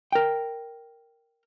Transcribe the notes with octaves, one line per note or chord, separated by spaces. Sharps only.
A#4 G5